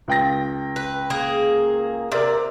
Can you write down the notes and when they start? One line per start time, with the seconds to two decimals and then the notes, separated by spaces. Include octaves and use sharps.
0.08 C#2 G5 A#6
0.76 B4
1.10 A#3 G#4
2.12 C3 A#4 D5